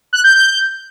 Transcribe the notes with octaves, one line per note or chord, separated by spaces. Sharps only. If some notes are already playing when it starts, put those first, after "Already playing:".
F#6
G6
G6